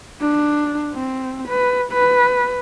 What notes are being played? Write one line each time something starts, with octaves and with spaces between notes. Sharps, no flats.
D4
C4
B4
B4